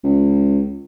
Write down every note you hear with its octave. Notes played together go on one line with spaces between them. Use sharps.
C#2